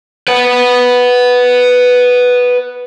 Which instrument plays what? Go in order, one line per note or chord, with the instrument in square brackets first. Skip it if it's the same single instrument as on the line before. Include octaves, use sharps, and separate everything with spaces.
[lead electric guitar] B4 F#5